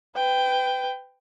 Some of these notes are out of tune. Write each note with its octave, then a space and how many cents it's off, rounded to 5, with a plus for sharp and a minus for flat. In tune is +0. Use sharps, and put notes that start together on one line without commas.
B4 +30 G5 +0